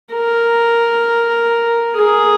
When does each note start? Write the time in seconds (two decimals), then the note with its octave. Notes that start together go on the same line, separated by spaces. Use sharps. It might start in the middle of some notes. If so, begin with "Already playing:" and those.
0.14 A#4
1.96 G#4